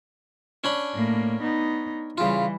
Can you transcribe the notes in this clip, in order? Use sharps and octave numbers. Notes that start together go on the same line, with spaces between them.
C#4 D4 B5
A2 A#3
B3 D#4
C#3 E3 G3 F4